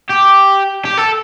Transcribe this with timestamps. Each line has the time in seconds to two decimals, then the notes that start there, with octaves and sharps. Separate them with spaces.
0.10 G4
0.85 G4
0.98 A4